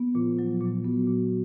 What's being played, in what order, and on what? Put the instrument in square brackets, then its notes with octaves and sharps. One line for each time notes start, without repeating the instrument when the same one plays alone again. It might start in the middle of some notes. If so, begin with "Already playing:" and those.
Already playing: [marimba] B3
[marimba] A#2 [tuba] F3
[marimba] F#3
A#2
[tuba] F#3 [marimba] B3
[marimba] A#2